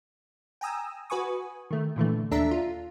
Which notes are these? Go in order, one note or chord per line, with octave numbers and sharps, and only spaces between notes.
G5 G#5 A#5 D#6 E6
F#4 B4 G#5 C#6 D#6
D#3 A3
A#2 D3 E3 A3
D#2 D4 A4 E5 A#5 B6
F4